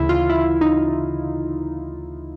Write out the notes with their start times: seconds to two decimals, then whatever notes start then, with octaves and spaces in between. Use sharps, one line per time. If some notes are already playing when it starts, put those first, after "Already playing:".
Already playing: D2 C#3 E3 E4
0.09 F4
0.30 E4
0.61 D#4